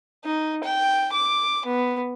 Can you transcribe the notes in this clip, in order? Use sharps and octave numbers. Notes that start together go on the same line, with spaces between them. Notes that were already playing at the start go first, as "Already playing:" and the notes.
D#4
G5
D6
B3